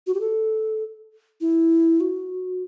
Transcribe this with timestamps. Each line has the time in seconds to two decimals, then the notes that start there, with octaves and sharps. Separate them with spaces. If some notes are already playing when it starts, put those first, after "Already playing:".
0.07 F#4
0.15 G4
0.21 A4
1.41 E4
2.01 F#4